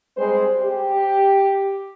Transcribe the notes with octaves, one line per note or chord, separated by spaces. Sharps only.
G3 G#3 C4 C5
G4